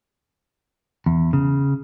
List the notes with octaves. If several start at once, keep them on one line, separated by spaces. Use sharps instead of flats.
E2
C#3